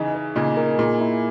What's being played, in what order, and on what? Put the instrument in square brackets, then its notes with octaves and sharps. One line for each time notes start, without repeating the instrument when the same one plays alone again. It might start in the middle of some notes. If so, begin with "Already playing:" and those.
Already playing: [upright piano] C#3 E3 [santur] D#4 G#4
[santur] D#5
[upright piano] A#2 C#3 [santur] D#4
[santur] A#4
[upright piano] A#2 [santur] G#4
[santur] E4